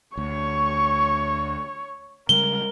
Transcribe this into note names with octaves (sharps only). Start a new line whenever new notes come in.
D2 C#5 C#6
C#3 G3 G#3 A#4 G7